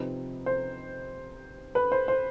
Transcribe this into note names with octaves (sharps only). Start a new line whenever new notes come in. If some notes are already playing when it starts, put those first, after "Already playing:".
Already playing: C3 F3 C4 D#4 B4
C5
B4
C5
C5